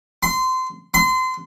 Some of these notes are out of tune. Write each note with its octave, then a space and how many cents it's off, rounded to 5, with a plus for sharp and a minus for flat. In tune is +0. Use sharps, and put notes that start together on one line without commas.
C6 -25
C6 -30